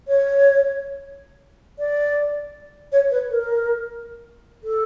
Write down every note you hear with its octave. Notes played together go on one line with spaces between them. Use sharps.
C#5
D5
C#5
B4
A#4
A4